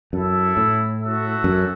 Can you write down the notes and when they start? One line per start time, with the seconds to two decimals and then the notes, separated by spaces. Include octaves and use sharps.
0.13 F#2 E4 A4 E5
0.57 A2
1.01 F#4 A4 E5
1.44 F#2